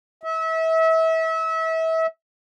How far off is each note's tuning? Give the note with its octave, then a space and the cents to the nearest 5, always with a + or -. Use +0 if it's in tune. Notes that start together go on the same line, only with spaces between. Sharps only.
E5 -30